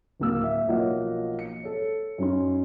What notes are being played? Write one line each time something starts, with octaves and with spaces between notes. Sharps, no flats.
D1 A#3 E6
E5
B1 F3 A#3 C#5 D#5 F#5
C#7
A4 C#5
F#2 C#4 D#4 C6